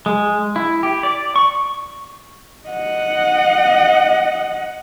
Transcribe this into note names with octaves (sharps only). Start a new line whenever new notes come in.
G#3
E4
G4
D5
C#6
D#5 F#5